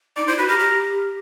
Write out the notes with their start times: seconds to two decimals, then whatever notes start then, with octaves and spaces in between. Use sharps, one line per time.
0.17 D#4 D5
0.27 E4 C5
0.38 F#4 B4
0.48 G4 A#4
0.59 G4